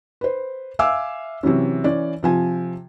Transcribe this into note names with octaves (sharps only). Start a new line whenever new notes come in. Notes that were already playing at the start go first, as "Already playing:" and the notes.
B4 C5
E5 F5 G#5 D6 E6
C3 E3 F#3 C#4
E3 C#4 D5
C3 F3 G#5